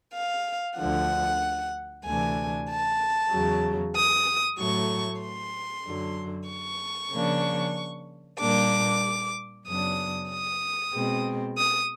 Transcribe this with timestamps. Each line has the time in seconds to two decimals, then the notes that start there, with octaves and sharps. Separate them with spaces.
0.14 F5
0.78 D2 D3 F3 F#5
2.05 D2 C3 E3 A3 D4 G#5
2.68 A5
3.32 E2 C#3 F#3
3.95 D#6
4.59 A2 F#3 A3 C#6
5.22 C6
5.86 F#2 D3 F#3
6.49 C#6
7.12 C#3 F3 A#3 D4
8.39 A#2 G3 A#3 D4 D6
9.66 F#2 C#3 F#3 B3 D4 D#6
10.30 D#6
10.94 B2 G#3 C4
11.57 D#6